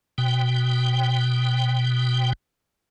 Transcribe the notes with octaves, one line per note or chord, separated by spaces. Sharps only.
B2 G5